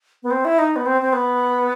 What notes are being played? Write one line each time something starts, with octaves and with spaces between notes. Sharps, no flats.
B3
C4
E4
D#4
B3
C4
C4
B3